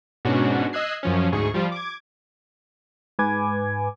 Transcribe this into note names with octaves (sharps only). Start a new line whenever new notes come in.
G#2 B2 C#4 D4 F#4
D#5 D#6 E6 F#6 G#6 C7
F#2 F3 C#4
D2 G#2 G#4 C#6
F3 G3 F4
D6 G#6
G#2 B4 G#5 D6 G#6